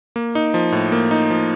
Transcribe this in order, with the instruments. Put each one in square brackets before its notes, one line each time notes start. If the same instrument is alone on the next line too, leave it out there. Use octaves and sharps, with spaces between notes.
[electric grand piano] A#3
D#4
F3
A2
A#3
D#4
F3